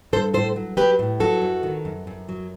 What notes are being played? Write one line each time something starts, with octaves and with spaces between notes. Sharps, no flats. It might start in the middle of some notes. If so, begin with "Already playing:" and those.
G2 A4 C5
A2 A4 C5
F#3
F#3 G4 B4
A2
F#3 F#4 A4
F#2
D#3
F#2
F#2
F#3